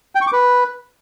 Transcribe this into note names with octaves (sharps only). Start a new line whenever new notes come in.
G5
C#6
D6
B4